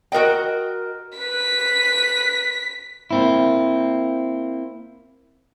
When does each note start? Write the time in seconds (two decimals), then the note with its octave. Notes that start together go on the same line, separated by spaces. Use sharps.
0.12 F#4 A#4 D#5 G5
1.18 B4 B6
3.11 A#3 C4 E4